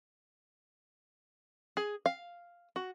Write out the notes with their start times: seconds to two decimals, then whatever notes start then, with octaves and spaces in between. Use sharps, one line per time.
1.77 G#4
2.06 F5
2.76 F#4